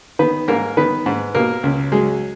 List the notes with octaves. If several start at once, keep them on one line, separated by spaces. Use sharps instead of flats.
D#3 B3 B4
G#2 A#3 A#4
D#3 B3 B4
G#2
B2 A#3 A#4
C#2
F#3 G#3 G#4